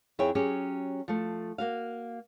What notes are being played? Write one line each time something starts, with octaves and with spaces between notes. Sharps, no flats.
F2 E4 G#4 C#5 G5
F#3 C#4 G4 G#4
F3 A3
A#3 F#4 F5